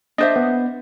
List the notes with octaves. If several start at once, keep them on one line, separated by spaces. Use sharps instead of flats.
D4 C5 D#5 E5
B3